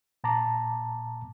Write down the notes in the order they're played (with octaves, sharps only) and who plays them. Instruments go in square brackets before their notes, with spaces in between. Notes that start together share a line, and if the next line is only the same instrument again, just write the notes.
[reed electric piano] A#2 A5 A#5 D6